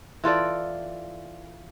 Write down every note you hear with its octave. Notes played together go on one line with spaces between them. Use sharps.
E3 F4 A4 D5